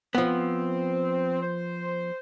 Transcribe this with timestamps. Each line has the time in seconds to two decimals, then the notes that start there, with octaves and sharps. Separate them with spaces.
0.15 F3 B3 C4
1.42 C5